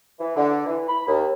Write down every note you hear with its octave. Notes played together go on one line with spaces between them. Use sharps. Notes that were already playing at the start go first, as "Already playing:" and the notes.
E3
D3
E3
B5
D#2